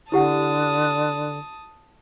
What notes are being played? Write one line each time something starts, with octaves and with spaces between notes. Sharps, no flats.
D3 E4 G4 F#5 A5 D#6